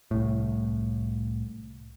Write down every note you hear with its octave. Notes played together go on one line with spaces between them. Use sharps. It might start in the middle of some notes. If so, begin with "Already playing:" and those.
C2 A2